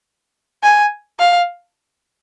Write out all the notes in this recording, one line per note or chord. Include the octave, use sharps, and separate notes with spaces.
G#5
F5